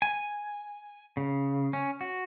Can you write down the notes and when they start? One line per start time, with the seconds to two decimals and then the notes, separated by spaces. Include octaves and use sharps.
0.02 G#5
1.17 C#3
1.73 C#4
2.01 F#4